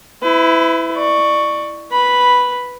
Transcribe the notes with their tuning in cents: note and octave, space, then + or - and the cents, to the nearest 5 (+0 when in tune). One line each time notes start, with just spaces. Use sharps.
E4 +0 B4 +40
D5 +25 C#6 +0
B4 +0 B5 -5